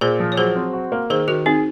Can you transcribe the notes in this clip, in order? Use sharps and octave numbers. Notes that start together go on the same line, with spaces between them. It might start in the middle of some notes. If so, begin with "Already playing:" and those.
A#2 G#4 C5
F3
C#5
F#3 G#4 C5
C4
F#4
A#3
D#3 G#4 C5
D#3 F#4 A#4
C4 D#4 G#4